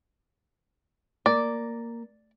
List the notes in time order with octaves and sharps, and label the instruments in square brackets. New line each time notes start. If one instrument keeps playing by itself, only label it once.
[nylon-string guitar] A#3 [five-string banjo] D5